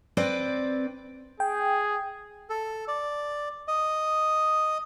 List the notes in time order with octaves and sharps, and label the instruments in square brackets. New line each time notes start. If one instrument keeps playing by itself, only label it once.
[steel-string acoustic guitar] C4 B4 D5
[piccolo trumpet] G#4 [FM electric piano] G5
[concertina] A4
D5
D#5